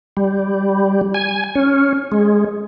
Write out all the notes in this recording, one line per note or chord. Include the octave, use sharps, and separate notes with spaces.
G3
G#5
C#4
G#3